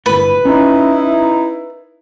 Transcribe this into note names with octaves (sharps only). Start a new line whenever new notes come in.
G1 A2 B4
C#4 D#4 E4